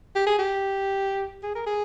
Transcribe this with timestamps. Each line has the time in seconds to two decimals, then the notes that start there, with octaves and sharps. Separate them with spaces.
0.15 G4
0.26 G#4
0.39 G4
1.43 G#4
1.55 A#4
1.67 G#4